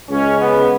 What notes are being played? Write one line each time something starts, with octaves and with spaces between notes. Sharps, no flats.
C#2 C#3 G#3 C#4
B3